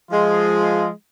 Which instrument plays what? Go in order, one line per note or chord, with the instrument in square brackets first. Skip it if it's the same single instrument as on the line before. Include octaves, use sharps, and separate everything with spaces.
[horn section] F3 G#3 F4